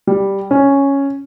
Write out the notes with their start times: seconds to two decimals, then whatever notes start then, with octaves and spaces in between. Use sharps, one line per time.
0.07 G3
0.51 C#4